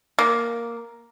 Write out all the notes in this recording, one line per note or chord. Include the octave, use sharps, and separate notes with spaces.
A#3